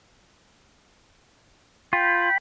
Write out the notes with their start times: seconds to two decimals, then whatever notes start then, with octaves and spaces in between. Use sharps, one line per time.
1.93 F4 G5 B5